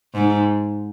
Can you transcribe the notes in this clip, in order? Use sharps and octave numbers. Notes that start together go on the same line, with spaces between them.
G#2